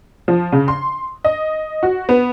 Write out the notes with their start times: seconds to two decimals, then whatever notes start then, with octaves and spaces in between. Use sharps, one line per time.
0.28 F3
0.52 C#3
0.68 C6
1.25 D#5
1.83 F#4
2.09 B3